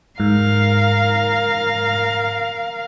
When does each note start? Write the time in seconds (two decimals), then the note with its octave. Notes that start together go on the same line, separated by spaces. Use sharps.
0.20 G#2 A#4 F5